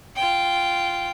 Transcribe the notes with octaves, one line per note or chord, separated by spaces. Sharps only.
F4 G5